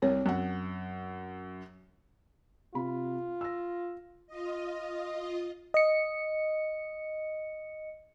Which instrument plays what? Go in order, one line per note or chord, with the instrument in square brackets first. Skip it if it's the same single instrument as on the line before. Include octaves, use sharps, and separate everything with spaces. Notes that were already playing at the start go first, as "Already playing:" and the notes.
[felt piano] C2 [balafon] C4 A#4 C#5
[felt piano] F#2 F#5
[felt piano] C3 B5 [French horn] F4
[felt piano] E6 A#6
[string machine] F4 D#5
[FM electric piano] D#5 C#7